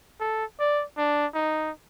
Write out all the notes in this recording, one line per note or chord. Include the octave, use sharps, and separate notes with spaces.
A4
D5
D4
D#4